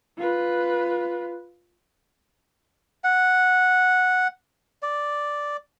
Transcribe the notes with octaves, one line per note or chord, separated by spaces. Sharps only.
F4 B4
F#5
D5